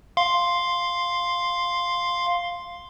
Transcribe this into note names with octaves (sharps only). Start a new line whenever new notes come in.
F5 C6